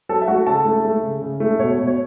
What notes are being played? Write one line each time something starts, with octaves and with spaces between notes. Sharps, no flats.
F#3 A4 A5
E5
A3 F#4 F#5
C#3 A4 A5
A3
A3
C#3
C#3
A3
B2 C#5
B2
C#5